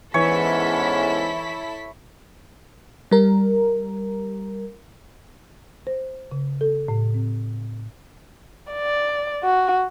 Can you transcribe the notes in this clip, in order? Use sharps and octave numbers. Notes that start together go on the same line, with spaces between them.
E2 G#2 E3 C#4 E4 A4 C#5 B6
G3 A#4
C5
C#3
A4
A2
C4
D5
F#4